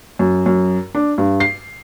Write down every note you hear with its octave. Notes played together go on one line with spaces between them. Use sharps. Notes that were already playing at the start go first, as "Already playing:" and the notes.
F#2
F#2
D4
G2
C7